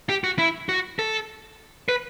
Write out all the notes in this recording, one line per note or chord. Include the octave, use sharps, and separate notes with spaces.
G4
F#4
E4
F#4
A4
B4